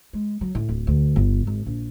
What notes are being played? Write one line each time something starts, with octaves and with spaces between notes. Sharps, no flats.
G#3
F#3
A2
D1
D2
G1
G#1
A#1